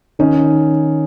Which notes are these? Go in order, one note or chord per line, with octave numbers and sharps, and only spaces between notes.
D#3 C#4 D#4